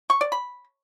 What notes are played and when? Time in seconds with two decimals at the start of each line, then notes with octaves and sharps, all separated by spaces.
0.10 C#6
0.21 D5
0.32 B5